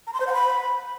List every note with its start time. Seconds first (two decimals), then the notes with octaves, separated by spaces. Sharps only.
0.07 A#5
0.14 C6
0.20 C5
0.27 F#5
0.34 B5